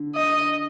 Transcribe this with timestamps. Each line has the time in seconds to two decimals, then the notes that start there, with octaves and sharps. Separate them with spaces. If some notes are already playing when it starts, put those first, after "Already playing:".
Already playing: D3
0.16 D#5